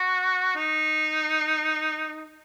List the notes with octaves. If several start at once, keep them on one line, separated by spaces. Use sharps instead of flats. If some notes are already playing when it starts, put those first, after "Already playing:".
Already playing: F#4
D#4